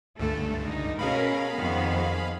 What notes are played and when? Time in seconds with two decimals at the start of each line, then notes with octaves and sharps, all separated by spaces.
0.20 C#2 G2 D3 A3 A4
0.65 D#4
0.99 B2 C#4 G#4 A#4 F5 B5
1.56 F2 D#3 B3